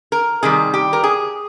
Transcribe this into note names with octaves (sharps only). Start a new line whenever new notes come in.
A#4
C3 D#3 G3 G#4
G4
A#4
G#4